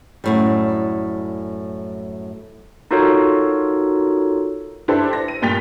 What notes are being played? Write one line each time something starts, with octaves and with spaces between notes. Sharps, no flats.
F#2 A2 G3
D#4 F4 F#4 A4 A#4 C#5
D4 E4 G4 A4 B4 C5
A#6
D#7
G2 A#2 G5 A6 B6 F7